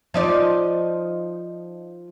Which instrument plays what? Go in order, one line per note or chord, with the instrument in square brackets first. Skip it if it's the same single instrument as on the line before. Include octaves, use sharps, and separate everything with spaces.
[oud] F3 D#4 D5